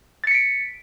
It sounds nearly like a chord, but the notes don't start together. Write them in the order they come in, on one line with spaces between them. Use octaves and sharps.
A6 C#7 B6 D7